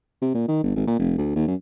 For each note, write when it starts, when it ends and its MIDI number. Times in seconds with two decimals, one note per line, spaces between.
0.22 0.30 48
0.34 0.46 46
0.48 0.58 51
0.64 0.72 31
0.76 0.84 32
0.87 0.98 46
0.99 1.14 29
1.18 1.31 38
1.36 1.47 39
1.48 1.55 42